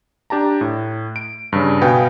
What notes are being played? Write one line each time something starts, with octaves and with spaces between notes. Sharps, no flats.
D4 G4 A5 A#5
A2
D7
G2 C#3
B2 B3 F5 G5 G#5